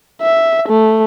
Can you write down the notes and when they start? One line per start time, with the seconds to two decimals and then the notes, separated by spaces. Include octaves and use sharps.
0.22 E5
0.69 A3